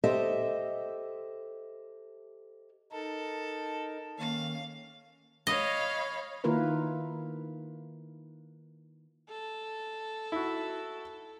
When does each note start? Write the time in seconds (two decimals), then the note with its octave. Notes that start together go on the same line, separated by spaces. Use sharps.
0.04 G4 A4 C5 D#5 E5
2.92 D#4 A4 A#4 A5
4.19 D#3 A#3 C#4 F5
5.47 C#5 D#5 F5 B5
6.44 D#3 A#3 E4 F4 A#4 B4
9.29 A4
10.32 E4 F#4